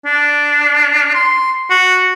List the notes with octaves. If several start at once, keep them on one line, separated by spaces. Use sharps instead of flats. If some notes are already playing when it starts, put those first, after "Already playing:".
D4
C6
F#4